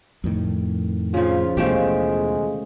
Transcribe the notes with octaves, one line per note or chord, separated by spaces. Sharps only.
F2 A2 D#3
C#3 F3 F4
D#2 B2 E3 F3 G#3 A3 G4